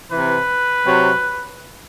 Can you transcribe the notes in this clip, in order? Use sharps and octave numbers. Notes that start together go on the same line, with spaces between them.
C3 E3 B4
C3 F#3